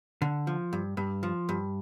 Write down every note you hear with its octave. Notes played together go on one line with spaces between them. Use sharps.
D3
F3
G2
G2
F3
G2